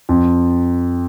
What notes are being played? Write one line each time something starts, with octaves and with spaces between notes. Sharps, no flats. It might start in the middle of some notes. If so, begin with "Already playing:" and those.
F2